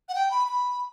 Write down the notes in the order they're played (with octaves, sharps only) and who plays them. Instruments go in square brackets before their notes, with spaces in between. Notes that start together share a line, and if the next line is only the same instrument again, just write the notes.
[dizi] F#5
G5
B5
B5